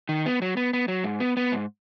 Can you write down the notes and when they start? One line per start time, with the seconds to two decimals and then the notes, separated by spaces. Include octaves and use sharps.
0.09 D#3
0.26 B3
0.42 F#3
0.57 B3
0.73 B3
0.88 F#3
1.04 G#2
1.20 B3
1.37 B3
1.52 G#2